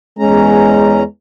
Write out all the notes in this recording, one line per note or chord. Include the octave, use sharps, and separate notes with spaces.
E2 G#3 C#4 A#5